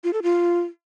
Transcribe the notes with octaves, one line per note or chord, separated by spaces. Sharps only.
F4
A4
F4